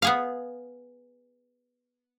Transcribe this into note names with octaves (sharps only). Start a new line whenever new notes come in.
B3 G#4 F5